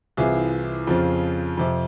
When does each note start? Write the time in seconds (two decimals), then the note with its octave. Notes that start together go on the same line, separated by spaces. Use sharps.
0.17 C2 C3 E3 F4 G#4
0.87 F2 C#3 F3
1.57 F2 C3 F3